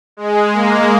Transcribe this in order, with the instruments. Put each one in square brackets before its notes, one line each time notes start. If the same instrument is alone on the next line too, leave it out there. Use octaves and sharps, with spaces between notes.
[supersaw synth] G#3
A#3